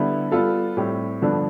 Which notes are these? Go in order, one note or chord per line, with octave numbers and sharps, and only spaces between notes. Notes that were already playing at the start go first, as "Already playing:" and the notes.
Already playing: D3 G3 B3 E4
G3 B3 F4 A4
A2 G3 C4 G4
G2 D3 F3 B3 D4